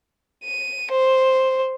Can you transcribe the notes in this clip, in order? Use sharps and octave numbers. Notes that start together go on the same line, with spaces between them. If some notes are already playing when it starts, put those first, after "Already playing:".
D#7
C5